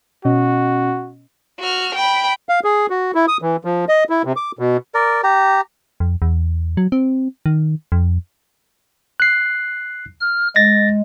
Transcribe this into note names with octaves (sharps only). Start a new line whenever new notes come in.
B2 C#4 F#4 D#5
F#4 F6
G5 B5
F5
G#4
F#4
E4
D#6
E3
F3
D#5
E4
C3
D6
B2
A#4 D5
G4 A#5
F2
E2
F#3
C4
D#3
F2
F#6 C7
F6
G#3 A6 A#6